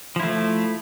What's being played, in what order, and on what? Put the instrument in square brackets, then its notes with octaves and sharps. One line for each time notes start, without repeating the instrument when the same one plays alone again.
[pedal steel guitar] F3
E4
A3